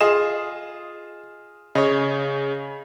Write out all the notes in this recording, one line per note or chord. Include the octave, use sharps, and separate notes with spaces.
F4 G#4 D#5 E7
C#3 C#5 D#5